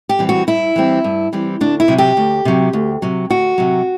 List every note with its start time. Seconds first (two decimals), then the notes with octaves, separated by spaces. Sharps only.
0.09 G4
0.19 E3 G3 C4
0.29 F#4
0.47 G2 E4
0.76 E3 G3 C4
1.04 G2
1.33 E3 G3 C4
1.61 D2 D4
1.80 E4
1.88 C3 F#3
1.98 G4
2.17 D2
2.45 C3 F#3
2.73 D2
3.02 C3 F#3
3.30 D2 F#4
3.58 C3 F#3